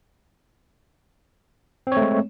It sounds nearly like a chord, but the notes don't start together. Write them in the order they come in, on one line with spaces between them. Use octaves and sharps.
C4 C#5 A3 G#3